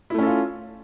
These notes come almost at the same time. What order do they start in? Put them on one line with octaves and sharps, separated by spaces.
E4 A3 C#4 A4 F4